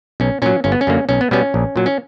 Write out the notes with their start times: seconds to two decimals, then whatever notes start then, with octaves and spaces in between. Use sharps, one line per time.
0.20 B1 C#4
0.42 A#2 F#3 C#4
0.64 G1 C#4
0.72 B3
0.81 C#4
0.87 F#2 D3 A#3
1.09 B1 C#4
1.21 B3
1.31 B2 G3 B3 C#4
1.54 A#1
1.76 A#2 F#3
1.86 C#4